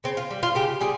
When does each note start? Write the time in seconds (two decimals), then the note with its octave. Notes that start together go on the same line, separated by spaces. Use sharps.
0.04 C#3 C4
0.17 F4
0.31 G3
0.43 F4
0.55 C#3 G4
0.81 G3 G#4